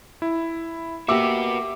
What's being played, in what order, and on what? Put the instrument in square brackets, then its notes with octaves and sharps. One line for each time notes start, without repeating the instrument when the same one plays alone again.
[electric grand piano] E4
[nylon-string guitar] A#3 G4 [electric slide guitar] F#4 B4 [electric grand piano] E5 D6 E6